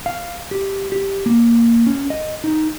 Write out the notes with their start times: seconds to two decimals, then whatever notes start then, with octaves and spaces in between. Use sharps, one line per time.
0.06 F5
0.51 G4
0.92 G4
1.26 A#3
1.87 C#4
2.10 D#5
2.44 D#4